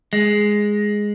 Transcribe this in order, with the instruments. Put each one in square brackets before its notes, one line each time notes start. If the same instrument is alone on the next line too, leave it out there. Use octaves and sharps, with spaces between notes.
[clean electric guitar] G#3